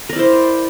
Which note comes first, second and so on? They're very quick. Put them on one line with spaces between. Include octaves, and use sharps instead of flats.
A#4 D5 E4 C5